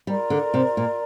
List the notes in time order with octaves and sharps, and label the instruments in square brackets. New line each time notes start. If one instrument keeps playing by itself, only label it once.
[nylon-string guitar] G3 [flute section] F4 A#4 D5 A#5
[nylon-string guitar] D3
C3
A#2